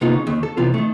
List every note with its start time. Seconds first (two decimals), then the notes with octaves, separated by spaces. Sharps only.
0.01 C3 A#3 B3 D#4 F4
0.14 C#3
0.27 D#2
0.43 A4
0.57 C3 E3 B3 F4
0.74 D#3 A3